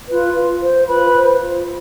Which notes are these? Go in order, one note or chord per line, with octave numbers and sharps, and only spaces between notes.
F4 B4
F4
C5
F4 B4 B5
C5
F4